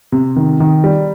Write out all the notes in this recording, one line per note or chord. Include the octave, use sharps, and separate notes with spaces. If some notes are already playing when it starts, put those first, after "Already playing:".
C3
D#3
D#3
G3